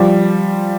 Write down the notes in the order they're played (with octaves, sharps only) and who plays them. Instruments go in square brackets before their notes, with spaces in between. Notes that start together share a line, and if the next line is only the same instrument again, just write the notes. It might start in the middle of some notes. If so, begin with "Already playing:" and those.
Already playing: [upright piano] F3 G3